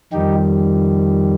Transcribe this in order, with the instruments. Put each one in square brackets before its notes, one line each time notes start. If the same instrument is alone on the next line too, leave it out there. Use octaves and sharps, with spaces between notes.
[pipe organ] F2 D#3 G3 D#4 G4